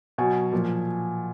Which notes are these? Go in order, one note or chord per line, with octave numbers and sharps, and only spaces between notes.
B2 F#3 G#5
A#2 F3